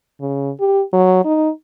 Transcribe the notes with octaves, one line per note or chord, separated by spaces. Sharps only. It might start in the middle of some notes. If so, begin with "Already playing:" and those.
C#3
G4
F#3
D#4